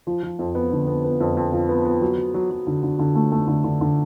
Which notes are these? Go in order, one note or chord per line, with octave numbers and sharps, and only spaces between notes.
F3
F3
F2
B3
D3
B3
B3
F2
F2
F3
B3
B3
F#3
F#3
F#3
F#3
D3
D3
D3
A3
A3
D3
D3
D3